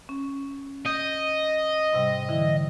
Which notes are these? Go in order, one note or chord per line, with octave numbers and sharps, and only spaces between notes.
C#4
D#5 G6
G#2 C3 G3
D3 E3 E4